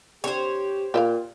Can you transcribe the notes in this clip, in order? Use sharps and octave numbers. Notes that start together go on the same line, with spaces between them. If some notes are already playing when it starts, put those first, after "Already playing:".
D3 C4 G4 C5 C#5
A#2 F4 G4 E5 F5